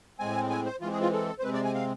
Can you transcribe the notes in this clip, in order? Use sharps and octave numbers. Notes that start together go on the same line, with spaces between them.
A2 G#3 C4 G#5
G#5
C5
E3 G#3 C4 F4
G#4
F4
A4
C5
C3 G#3 C4 B4
D5
G#5
F5